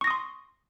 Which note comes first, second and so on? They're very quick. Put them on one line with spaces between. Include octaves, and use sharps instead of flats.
C#6 A#6 D#6 C6